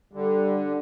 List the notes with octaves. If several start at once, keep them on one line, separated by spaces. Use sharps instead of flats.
D3 G3